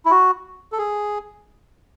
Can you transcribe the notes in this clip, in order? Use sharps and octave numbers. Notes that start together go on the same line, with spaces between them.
E4
F#4
A4
G#4